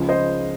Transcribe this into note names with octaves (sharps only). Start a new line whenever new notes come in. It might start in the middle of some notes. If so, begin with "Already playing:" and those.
Already playing: C#2 C#3 F3
C5 D#5